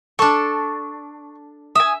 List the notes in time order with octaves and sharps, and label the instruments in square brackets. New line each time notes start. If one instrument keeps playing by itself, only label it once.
[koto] D4 A4 [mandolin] C#6
[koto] E5 [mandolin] G#5 D#6